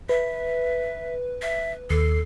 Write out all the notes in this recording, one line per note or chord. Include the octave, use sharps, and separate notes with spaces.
B4 E5
E5
D#2 A4 C7